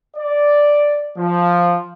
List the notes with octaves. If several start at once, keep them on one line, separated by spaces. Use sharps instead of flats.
D5
F3